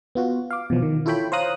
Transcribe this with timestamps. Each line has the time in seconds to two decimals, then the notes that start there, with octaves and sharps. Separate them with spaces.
0.15 B3 F4 F#4
0.50 F5 D6
0.70 B2 E3 F3
0.82 D#3
1.06 E4 F4 A4 C#5 G5 B5
1.32 C5 C#5 F5 A#5 D#6 F#6